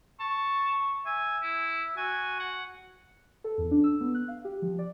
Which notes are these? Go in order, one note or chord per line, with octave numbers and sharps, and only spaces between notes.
A5 C#6
E5 G#5
E4
F#4 G#5
F#5
A4
E2
D4
E6
B3
F#6
F5
G4
F3
D5